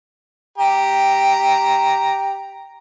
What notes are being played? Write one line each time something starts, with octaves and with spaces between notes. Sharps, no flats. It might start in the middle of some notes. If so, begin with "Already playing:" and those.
G4 A#5